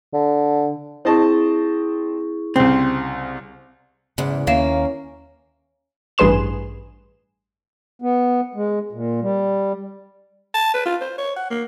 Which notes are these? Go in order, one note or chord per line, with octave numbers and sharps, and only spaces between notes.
D3
C4 E4 G#4 D#5 A5 C#6
C2 C#3 C4
E2 G#2 C#3
D#2 A#3 C#4 E5 F5 E7
A1 G2 G#4 B4 C6 E7
B3
G#3
A#2
G3
A5
B4
F4
C5
C#5
F#5
A#3